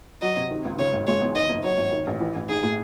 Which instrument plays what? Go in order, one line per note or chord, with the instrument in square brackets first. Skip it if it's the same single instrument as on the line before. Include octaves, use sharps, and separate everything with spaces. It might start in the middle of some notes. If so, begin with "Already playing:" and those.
[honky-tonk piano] F#3 [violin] D#5
[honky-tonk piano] C3
D#3
C#2
[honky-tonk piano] C#3 [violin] C#5
[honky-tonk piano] G#1
[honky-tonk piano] G#3 [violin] C#5
[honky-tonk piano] E2
[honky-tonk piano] D#3 [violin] D#5
[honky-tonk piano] F#1
[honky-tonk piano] F#3 [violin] C#5
[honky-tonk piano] G#1
D#3
A1
E3
A1
[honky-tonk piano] D#4 [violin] G#4
[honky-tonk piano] A2